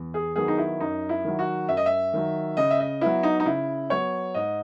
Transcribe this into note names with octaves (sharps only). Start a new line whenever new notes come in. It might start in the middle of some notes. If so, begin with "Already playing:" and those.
Already playing: E2
G#4
D#3 F#3 B3 G#4
D#4
E4
F#2 D#4
E4
D#3 F#3
F#4
F#2 E5
D#5
E5
D#3 F#3
C#3 D#5
E5
D#5
F#3 B3 E4
D#4
D#4
C#3 E4
F#3 B3 C#5
G#2 D#5